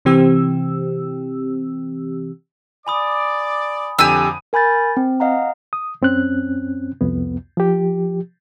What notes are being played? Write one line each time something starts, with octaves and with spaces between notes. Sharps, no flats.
C3 E3 C4 G4 E6
D5 G#5 B5 D6 D#6
F2 D3 G4 G#5 E6 D#7
A#4 G#5 B5 G6 A6
C4
D#5 F5 F#5 A#5
D#6
F#2 C4 C#4 F#6
C2 F2 B3
F3 G4